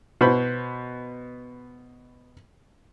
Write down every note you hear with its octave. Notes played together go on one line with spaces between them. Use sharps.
B2 B3 C5 B5